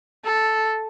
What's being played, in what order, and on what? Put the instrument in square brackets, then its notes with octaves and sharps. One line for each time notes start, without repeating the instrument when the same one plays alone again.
[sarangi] A4